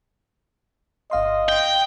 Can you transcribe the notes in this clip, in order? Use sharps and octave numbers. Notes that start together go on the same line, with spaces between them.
G1 D#5 F5 C6
G5